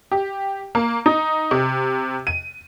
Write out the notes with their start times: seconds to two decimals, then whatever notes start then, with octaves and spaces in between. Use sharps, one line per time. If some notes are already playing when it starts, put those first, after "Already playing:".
0.11 G4
0.75 A#3
1.06 D#4
1.51 C3
2.27 D#7